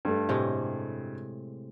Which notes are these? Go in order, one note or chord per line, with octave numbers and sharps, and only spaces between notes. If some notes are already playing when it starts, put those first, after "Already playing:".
G2 A3
A2 C3 G#3